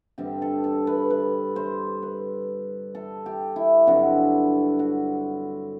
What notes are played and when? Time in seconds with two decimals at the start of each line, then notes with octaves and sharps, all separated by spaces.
0.18 G2 D3 G3 C4 G4
0.42 A4
0.64 A4
0.87 B4
1.10 B4
1.56 C5
2.03 B4
2.95 A4
3.26 G4
3.56 E4
3.87 G2 D3 F#3 C4 F#4
4.79 F#4